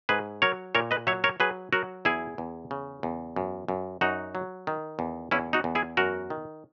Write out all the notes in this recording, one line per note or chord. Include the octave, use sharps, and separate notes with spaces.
G#2 G#4 B4
F#3 A#4 C#5
A#2 A#4 C#5
B4 D#5
F#3 C#5 E5
A#4 C#5
F#3 G#4 B4
F#3 F#4 A#4
E2 E4 G#4
E2
C#3
E2
F#2
F#2
F#2 D#4 F#4
F#3
D#3
E2
E2 C#4 E4
D#4 F#4
E2
E4 G#4
F#2 F#4 A#4
D#3